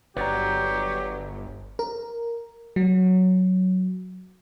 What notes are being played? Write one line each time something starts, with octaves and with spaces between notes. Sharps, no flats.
G1 F#3 G4 B4 D5 A#5
A#4
F#3